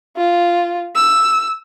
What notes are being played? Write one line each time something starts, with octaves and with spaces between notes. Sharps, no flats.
F4
E6